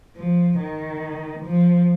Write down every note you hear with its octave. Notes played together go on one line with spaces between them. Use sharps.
F3
D#3
F3